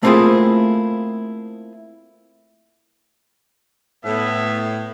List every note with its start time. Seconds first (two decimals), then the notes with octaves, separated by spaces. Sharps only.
0.03 A3 A#3 C4 E4 F4 G#4
4.05 A2 B3 E5